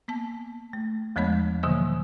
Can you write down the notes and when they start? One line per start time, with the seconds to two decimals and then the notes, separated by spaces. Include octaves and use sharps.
0.08 A#3 B3 A5
0.73 A3
1.16 E2 F3 G#3 B3 C#5 B5
1.63 B2 D3 D#3 F3 F#3 A#3